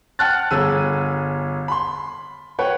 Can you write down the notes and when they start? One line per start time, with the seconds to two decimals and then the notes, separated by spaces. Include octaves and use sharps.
0.19 F#5 G5 A5 F6 F#6 A6
0.51 G1 G#4 E6 D#7
1.68 B5 C6
2.59 B4 C#5 F#5 G5